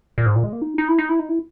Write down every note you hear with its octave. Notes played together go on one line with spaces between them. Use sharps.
A#2
G#2
A#2
G#3
A#3
D#4
D#4
E4
D#4
E4
D#4
E4